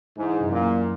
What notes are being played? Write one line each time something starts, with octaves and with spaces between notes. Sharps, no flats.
G#2 E3
F#2
A#2
A#3